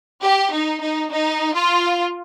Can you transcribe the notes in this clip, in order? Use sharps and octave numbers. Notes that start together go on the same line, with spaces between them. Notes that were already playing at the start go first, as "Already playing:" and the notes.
G4
D#4
D#4
D#4
F4